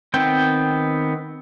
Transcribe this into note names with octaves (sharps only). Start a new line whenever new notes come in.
D#3 B3 C4 G5